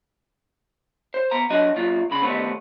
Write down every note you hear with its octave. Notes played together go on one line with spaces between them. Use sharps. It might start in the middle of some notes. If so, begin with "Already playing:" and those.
C5
B3 A#5
F#3 D4 F#4 D#5
A#2 F#3 F4
C2 C#3 B5
D#3 G3 A3 B3 C4